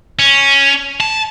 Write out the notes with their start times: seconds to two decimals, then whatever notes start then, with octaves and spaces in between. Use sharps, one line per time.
0.19 C#4
1.00 A5